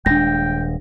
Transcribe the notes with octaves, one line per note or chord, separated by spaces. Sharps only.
D#1 G#3 D4 G5 A#6